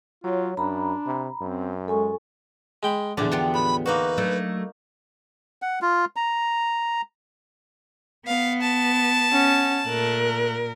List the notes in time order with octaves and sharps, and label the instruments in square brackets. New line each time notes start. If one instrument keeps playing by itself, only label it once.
[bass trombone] F#3 [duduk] F4 [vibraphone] C#5
[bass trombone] F#2 [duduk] D4 [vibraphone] A#5 B5
[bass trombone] C3
[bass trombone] F#2 [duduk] C4
[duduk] G#3 [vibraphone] A4 G#5 C#6
[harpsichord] G#3 G5 B5
[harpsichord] E2 D3 [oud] A#2 F3 [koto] D4
[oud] B3 F4 G4
[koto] A2 [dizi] B5
[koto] A#3 D#4 F#4 [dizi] B4
[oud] F#3 A3 D4
[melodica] F#5
F4
A#5
[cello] B3 [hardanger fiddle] F5
[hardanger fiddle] A5
[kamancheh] C#4 F#5
[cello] A#2 A#4 [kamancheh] A3 F#6